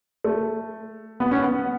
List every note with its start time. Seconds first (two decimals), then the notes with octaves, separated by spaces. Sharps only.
0.24 A3
1.20 B3
1.31 C#4
1.42 B3